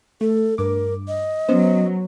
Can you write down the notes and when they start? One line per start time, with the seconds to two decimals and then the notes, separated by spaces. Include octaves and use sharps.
0.21 A3 A4
0.58 G2 A#4 D6
1.08 D#5
1.49 F#3 B3 C#4 C5